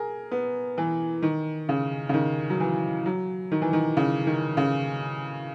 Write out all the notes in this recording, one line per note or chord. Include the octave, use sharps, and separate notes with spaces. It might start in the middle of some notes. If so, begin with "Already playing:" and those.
Already playing: G#4 A#4
B3
E3
D#3
C#3
C#3
D#3
F#3
E3
F#3
D#3
E3
D#3
C#3
D#3
C#3